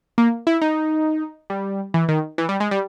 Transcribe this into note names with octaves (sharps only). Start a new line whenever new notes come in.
A#3
E4
D#4
G3
E3
D#3
E3
G3
G#3
G3